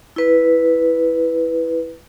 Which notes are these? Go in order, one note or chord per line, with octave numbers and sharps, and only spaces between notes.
E4 B4